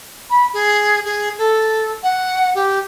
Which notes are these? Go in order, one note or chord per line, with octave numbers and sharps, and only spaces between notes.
B5
G#4
G#4
A4
F#5
G4